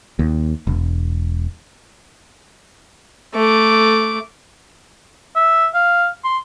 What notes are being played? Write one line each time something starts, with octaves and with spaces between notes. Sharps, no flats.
D#2
E1
A3 D6
E5
F5
C6